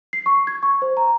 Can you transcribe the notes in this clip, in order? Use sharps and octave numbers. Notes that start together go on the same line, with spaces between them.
C7
C#6
G#6
C#6
C5
A#5